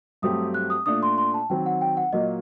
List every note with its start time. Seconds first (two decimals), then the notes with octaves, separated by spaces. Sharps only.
0.22 G2 F#3 A3 C4 G4 D#6
0.54 F#6
0.70 D#6
0.86 A#2 A3 D4 D#6
1.03 C6
1.18 C6
1.34 A5
1.50 D#3 F#3 C4 G5
1.66 F#5
1.81 G5
1.97 F#5
2.13 A#2 F#3 A#3 D#5